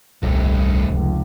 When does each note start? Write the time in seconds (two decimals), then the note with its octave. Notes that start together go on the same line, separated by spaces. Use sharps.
0.22 D#1 C2 G2 C3 A3
0.89 F1 C#2